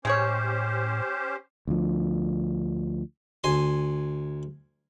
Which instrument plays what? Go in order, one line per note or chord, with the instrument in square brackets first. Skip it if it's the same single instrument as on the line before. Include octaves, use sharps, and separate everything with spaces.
[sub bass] A2 [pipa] G#3 G#4 C#5 [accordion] C#4 G4 C5
[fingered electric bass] D2 F3
[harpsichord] D2 G#5 C6